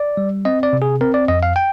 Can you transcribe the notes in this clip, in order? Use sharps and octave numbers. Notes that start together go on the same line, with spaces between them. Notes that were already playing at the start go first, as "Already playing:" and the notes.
Already playing: D5
G3
C4 D#5
D5
C3
G#4
C4 A#4
D5
F2 D#5
F5
G5